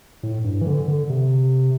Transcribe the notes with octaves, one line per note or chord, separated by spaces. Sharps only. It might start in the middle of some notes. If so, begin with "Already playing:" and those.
A2
G2
E3
D3
D3
C3